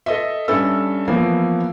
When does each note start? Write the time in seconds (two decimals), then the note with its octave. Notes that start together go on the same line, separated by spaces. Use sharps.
0.06 A4 D#5 E5
0.48 G2 C#4 A4 E5 E6
1.07 E3 F3 A#3 B3